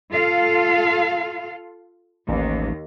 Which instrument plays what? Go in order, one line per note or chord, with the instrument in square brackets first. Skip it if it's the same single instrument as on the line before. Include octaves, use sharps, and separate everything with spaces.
[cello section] F4 A4 F5
[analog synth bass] A1 [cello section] D#2